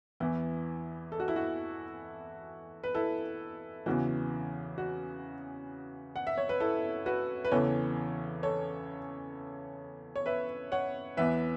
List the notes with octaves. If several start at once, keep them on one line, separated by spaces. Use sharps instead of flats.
E2 E3 E4
A4
F#4
E4
F#4
B4
E4 A4
E2 C#3 E3 F#4
F#4
F#5
E5
C#5
B4
E4 A4
F#4 B4
B4
E2 C#3 E3 A4 C#5
A4 C#5
C#5
B4 E5
C#5 F#5
E2 E3 B4 E5